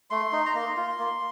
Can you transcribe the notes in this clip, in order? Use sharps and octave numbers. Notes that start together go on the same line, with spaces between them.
A3 C6
D#4
A#5
A#3 C6
F4
A#3